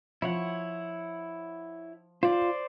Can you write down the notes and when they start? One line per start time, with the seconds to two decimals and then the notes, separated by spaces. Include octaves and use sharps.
0.22 F3 E4 C#5 F#5
2.23 F4 C5 D5